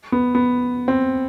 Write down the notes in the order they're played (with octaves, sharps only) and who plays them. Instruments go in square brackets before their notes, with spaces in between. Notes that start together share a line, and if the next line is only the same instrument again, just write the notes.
[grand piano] B3
B3
C4